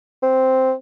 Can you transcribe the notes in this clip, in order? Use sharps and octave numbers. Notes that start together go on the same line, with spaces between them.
C4